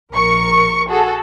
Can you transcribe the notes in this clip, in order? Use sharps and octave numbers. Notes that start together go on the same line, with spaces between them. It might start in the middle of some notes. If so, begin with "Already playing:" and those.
A#1 A#4 C#6 C#7
F#4 G#4 A4